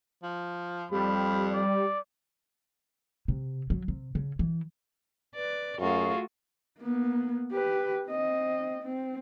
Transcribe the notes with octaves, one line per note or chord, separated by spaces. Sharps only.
F3
F2 G3 B5
D5
C3
F#3
C3
C#3
E3
B4 D5
F#2 A3 F4 F#4 G#4 F5 C#6
A#3 B3
G4 B4
C4 D#5
C4